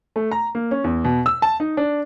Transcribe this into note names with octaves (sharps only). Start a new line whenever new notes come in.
A3
A#5
A#3
C#4
E2
B2
E6
A5
D#4
D4